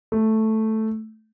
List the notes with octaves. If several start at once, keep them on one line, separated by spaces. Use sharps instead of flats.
A3